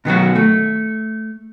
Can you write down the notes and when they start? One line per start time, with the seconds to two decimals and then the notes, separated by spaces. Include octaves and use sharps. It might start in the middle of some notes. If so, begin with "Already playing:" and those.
0.05 B2 D#3 F#3 F#4
0.35 A3